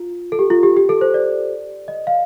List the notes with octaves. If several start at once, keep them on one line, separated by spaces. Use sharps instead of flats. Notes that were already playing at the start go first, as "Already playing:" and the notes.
Already playing: F4
A4
G4
F4
G4
G4
A4
C5
D5
D#5
F5